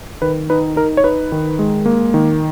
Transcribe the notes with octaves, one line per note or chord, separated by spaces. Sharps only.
D#3 B4
D#4 B4
D#4 A#4
C#5
D#4 B4
D#3
G#3
A#3
D#3